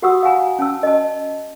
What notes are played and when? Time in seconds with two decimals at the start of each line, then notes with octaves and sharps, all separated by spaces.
0.02 F#4 G4 F#5 D#6 E6
0.23 F5 F#5 G#5 A#5
0.59 C#4 A5 E6
0.83 D#5 A5